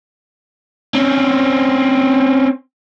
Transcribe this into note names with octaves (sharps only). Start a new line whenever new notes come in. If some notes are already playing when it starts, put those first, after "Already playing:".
C4 C#4